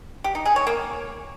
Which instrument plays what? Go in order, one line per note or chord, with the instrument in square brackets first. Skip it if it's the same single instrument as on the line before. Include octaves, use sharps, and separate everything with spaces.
[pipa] G4
D#4
G#4
C#5
A#3